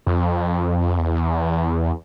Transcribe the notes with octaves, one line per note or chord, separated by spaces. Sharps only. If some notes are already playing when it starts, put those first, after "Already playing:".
F2
E2